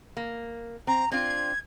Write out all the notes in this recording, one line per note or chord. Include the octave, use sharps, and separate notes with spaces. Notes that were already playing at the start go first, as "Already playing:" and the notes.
A#3
C4 A#5
C4 D4 F4 G#6